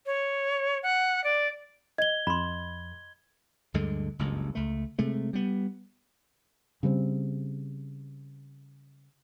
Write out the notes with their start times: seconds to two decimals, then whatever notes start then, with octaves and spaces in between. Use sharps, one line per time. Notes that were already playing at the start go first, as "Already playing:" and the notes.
0.06 C#5
0.83 F#5
1.24 D5
1.98 D#5 G#6 G7
2.27 F2 B5 C6
3.74 D2 G2 D3 G#3
4.19 F#1 C#2 G2
4.55 C#2 A3
4.99 C3 G#3 A3
5.33 G3 B3
6.83 C#3 G3 A3 C4